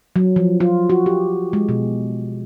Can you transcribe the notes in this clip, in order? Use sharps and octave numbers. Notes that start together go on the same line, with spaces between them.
F#3
F3
F4
F#4
G4
G#3
B2